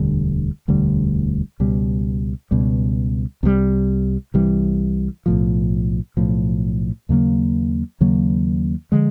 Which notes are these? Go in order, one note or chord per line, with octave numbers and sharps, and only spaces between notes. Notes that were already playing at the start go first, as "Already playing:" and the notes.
Already playing: E1 D2 D3 G3
E1 D2 D3 G3
C#2 B2 G3
C#2 B2 G3
C2 C3 E3 G3
C2 C3 E3 G3
B1 A2 F3
B1 A2 F3
D#2 C#3 F#3 A#3
D#2 C#3 F#3 A#3
D3 F3 G#3